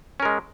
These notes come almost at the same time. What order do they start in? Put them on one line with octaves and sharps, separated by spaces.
C#4 A#4 G#3